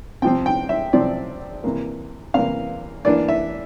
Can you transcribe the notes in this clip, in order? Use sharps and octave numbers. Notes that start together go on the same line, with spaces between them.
C3 F3 C4 G5
G5
E5
C3 F3 C4 D5
C3 E3 A#3
C3 E3 A#3 F5
E3 A#3 D4 D5
E5